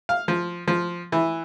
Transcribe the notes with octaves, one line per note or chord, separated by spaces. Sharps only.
F5
F3
F3
E3